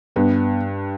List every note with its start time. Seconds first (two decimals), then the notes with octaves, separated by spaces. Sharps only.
0.16 G2 B3